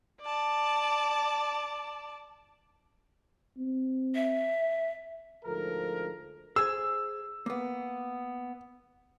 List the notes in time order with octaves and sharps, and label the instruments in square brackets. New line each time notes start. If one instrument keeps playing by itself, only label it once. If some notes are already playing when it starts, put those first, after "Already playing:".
[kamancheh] D5 A5
[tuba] C4
[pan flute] E5
[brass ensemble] D2 G#2 F3 A4 A#4
[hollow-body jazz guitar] G#4 C5 G#5 [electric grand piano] E6
[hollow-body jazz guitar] A#3 B3